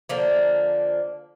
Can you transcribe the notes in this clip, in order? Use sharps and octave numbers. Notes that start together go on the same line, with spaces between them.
D3 F3 A#3